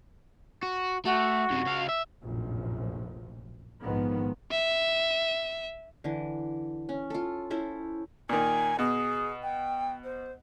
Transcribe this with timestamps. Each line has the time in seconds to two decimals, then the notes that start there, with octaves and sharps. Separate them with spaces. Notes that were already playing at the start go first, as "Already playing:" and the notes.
0.63 F#4
1.05 A3 F#4
1.50 F#2 C3
1.67 C#2 F5
1.89 E5
2.23 F1 A#1 F#2 A2 F3
3.83 A#1 G#2 D#3 F3 B3
4.52 E5
6.04 D3 E3
6.89 C#4
7.10 F4 A4
7.50 C#4 E4 A4 C5
8.29 A#2 D#3 G#5
8.79 B2 G#4
9.43 G5
10.04 C5